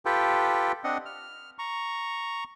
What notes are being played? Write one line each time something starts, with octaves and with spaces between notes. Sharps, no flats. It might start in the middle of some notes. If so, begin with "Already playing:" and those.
F4 G4 A4 B4 G5
C4 D4 D#5 F#5
F6
A#5 C#6